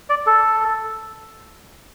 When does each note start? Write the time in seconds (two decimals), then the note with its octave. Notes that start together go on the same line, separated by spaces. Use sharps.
0.09 D5
0.27 A4